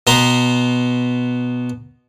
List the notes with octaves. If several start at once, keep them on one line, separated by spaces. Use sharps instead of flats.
B2 B3 A#5 C6